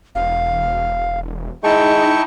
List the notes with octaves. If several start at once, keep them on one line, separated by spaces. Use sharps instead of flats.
E1 F5
G#3 D#4 E4 G5 A5 C#6